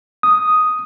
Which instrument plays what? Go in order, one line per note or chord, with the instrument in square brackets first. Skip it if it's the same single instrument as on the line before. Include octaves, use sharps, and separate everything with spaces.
[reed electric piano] D#6